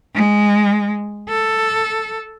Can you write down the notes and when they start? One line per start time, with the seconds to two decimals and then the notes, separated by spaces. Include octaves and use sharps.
0.15 G#3
1.29 A4